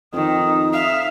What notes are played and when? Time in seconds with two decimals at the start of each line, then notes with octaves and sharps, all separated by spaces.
0.14 F2 D#3 D#4 D#6
0.73 E5 F5